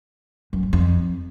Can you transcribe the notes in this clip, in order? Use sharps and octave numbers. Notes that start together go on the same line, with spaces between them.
F#2
G2
F2